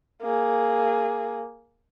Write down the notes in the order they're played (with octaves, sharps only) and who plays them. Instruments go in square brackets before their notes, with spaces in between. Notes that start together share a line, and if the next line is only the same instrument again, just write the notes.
[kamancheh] A#3 G#4